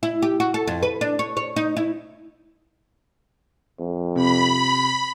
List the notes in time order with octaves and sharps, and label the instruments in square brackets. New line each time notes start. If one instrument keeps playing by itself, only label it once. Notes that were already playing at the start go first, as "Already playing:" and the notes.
[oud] E4
G4
F#4
A4
F2
B4
D4
C#5
C#5
D#4
E4
[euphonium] F2
[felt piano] C3 [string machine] B5